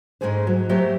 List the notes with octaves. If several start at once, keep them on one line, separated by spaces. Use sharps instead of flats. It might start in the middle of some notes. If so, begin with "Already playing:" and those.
G#2 C3 G#3 A3 G#4 C5
F#3
F#3 A3 G4 A#4 C5 E5